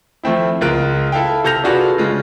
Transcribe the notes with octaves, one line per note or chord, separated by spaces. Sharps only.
F3 A3 C4 E4
C#2 G#3 F4 A#4 F#6 D7
E4 A4 E5 F5 G5
C3 A4 F6 G6 A#6 F7
D4 F4 F#4 G#4 A4 B4
C#3 G#3 F4